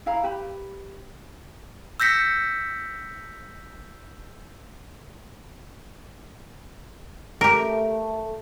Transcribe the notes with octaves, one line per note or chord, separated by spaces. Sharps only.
E4 F5 A#5 B5
G4 B4 B5
E6 G6 A#6 B6 C#7
A3 G4 A#4